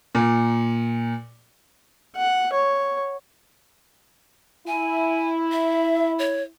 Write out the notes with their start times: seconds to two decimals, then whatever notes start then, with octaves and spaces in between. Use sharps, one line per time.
0.15 A#2
2.16 F#5
2.53 C#5
4.67 E4 G#5
5.52 E5
6.19 C#5